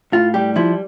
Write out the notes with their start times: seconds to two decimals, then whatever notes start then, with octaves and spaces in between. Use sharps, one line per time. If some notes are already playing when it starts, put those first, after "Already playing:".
0.12 A2 F4
0.34 G3 G4
0.56 F3 E4